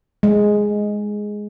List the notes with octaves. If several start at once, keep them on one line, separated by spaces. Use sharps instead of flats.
G#3